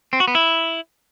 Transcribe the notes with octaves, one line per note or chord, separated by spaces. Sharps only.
C4
F#4
B3
E4